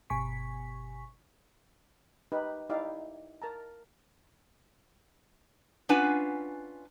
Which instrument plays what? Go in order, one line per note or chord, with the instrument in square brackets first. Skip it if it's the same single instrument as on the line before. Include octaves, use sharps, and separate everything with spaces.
[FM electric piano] G1 B2 G#5 C#6 B6
[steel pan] D#4 G4 B4
D#4 E4 G4 D5 E5 F5
A#4 A5 A#5
[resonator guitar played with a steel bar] C#4 D4 F4 B4 F#5 G#5